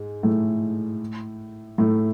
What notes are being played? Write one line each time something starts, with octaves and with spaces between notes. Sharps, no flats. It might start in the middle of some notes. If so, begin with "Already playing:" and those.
Already playing: G#2 G#3
A2 A3
A2 A3